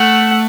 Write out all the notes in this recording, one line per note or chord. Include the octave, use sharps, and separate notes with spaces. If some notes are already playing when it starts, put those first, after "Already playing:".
Already playing: A3 F#5